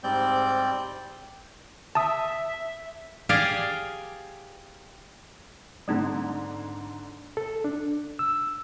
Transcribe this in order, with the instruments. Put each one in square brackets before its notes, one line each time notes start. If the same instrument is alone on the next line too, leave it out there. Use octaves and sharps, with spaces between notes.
[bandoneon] G#2 G3 C4 D5 G6
[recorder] E5 [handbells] A5 D#6
[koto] G4 G#4 D5 F5
[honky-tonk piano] G#2 D3 D4 [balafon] G3 A3 C4
[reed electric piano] A4
D4
E6